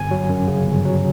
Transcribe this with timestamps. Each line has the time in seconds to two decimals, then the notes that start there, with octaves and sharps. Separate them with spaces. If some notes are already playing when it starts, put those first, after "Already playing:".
Already playing: G1 G#5
0.11 F#3
0.29 F#2
0.47 C#3
0.66 G1
0.85 F#3